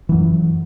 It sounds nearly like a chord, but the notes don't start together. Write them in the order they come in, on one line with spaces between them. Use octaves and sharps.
E3 F#3 F#2